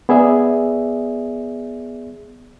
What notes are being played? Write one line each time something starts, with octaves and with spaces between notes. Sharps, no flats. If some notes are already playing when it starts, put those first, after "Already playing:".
B3 G#4 D5 E5